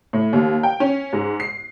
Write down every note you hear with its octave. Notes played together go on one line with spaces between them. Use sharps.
A2
D#2
G5
C#4
G#2
C7